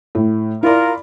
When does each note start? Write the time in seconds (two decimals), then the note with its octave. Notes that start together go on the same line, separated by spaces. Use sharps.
0.15 A2
0.63 E4 F4 A#4 D5